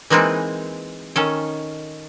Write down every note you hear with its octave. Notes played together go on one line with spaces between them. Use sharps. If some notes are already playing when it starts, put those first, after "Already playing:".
E3 G#3 A#3 C4 D#4 B4
D#3 C#4 A4